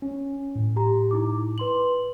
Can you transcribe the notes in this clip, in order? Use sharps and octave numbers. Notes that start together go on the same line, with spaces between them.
C#4
A2
G4 A#5
D#4 E4 D6
B4 C6 F#7